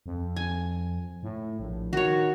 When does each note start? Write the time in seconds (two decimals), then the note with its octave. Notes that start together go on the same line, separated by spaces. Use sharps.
0.06 F2
0.36 G#5
1.23 A2
1.60 A#1
1.93 D#3 F#4 C#5